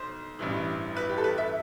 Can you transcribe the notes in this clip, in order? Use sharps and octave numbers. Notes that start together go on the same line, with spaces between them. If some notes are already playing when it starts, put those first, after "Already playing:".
Already playing: B1 C5
A1 G2 E3
B4
G4
A4
B4
E5